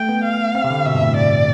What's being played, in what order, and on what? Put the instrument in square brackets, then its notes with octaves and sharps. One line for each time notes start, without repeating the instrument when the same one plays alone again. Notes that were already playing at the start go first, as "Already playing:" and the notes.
Already playing: [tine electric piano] A3 [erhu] G5
[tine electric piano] B3
[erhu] F5
[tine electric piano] C4
C3
D3
[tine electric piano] B2 [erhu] E5
[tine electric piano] G2
A2
[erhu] D5